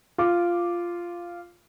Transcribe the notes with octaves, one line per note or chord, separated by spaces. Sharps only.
F4 D6